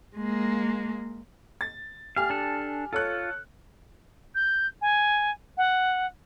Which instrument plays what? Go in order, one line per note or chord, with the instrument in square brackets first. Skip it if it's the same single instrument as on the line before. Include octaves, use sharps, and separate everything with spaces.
[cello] G#3 A#3
[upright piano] A6
[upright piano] G4 G#5 F6 [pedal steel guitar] F5
[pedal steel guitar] D4 A4
[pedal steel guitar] F4 [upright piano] A4 C#5 F#6
[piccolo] G6
G#5
F#5